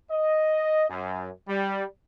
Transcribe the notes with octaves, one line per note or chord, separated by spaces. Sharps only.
D#5
F#2
G3